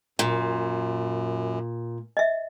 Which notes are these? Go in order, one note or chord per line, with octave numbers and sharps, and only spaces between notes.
F#2 A#2
D#5 E5